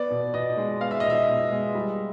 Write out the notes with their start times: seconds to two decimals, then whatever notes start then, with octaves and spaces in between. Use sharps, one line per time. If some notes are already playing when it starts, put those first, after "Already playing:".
Already playing: B3 D5
0.10 B2
0.34 B2 D#5
0.57 G#3
0.81 B3 F5
0.91 E5
1.00 B2 D#5
1.10 E5
1.28 B2
1.52 G#3
1.75 G3